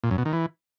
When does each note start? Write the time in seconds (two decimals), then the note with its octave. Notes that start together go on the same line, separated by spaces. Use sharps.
0.04 A#2
0.11 F#2
0.18 B2
0.25 D#3
0.33 E3